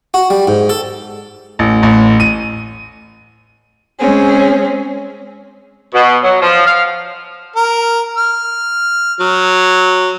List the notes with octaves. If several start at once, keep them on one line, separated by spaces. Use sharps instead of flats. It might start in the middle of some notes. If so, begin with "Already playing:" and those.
F#4
G3
G#2
A4
A1
A1
D#7
G#3 C4 C#4 G#4
B2
F#3
F3
F5
A#4
F6
F#3